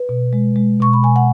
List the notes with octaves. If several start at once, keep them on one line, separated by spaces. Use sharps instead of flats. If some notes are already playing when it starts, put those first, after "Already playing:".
Already playing: B4
B2
G#3
G#3
B2 C#6
B5
B2 G#5
F#5